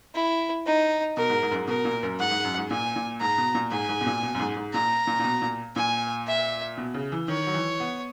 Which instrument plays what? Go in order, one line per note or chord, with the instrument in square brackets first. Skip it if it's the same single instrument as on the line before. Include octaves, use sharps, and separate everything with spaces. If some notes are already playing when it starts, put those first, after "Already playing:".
[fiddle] E4
D#4
[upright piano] B2 [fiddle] A#4
[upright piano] G#2
G#2
F#2
G#2
[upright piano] B2 [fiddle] A#4
[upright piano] A#2
F#2
[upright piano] G#2 [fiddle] F#5
[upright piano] G#2
F#2
G#2
[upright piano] A#2 [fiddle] G#5
[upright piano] A#2
[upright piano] G#2 [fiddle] A#5
[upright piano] B2
A#2
[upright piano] G#2 [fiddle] G#5
[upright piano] G#2
B2
A#2
B2
F#2
G#2
G#2
[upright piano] A#2 [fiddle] A#5
[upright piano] A#2
A#2
B2
A#2
[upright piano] A#2 [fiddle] G#5
[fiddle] E5
[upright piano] B2
C#3
E3
[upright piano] D#3 [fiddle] C#5
[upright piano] F#3
E3
B3